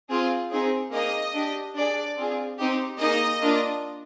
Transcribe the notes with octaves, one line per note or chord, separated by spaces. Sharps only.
C4 F4 G#4
C4 D#4 G#4
A#3 D#4 G#4 D#5
D4 G4
D4 G#4 D5
C4 F4 G#4
C4 D#4 G4
A#3 D#4 G#4 D#5
A#3 D4 F4